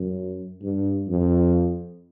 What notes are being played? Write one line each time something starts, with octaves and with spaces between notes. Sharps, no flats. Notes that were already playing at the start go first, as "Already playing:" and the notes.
Already playing: F#2
G2
F2